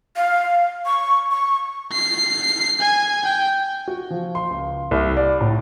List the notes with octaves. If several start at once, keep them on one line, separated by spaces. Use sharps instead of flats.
F5
C#6
C#6
C7
G#5
G5
F#4
F3
C6
C#2
C2
D5
A2